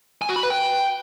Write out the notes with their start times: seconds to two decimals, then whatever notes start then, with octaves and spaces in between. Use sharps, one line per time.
0.22 G#5
0.29 F#4
0.36 B5
0.43 B4
0.50 G5